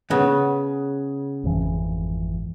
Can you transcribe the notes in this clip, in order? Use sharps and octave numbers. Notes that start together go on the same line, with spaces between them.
C#3 B3
G#1 F2 E3